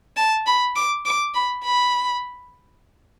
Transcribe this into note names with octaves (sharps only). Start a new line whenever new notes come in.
A5
B5
D6
D6
B5
B5